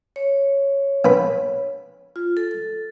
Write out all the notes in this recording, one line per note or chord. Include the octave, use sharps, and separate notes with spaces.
C#5
A#1 B4
F4
A4